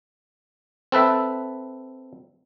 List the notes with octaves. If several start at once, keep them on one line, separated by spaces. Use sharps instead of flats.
C4 A4 B4 E5